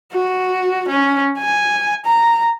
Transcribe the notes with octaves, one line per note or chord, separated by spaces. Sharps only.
F#4
C#4
G#5
A#5